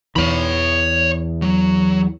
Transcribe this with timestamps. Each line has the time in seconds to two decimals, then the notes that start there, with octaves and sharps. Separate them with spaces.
0.16 E2 E3 C#5 B5
1.42 F#3